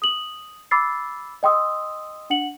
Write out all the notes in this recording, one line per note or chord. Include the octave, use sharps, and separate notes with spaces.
D#6 F#7
B5 D6 E6 A6 C7
D#5 G5 C6 D#6 E6
D4 F#5 C#7 F#7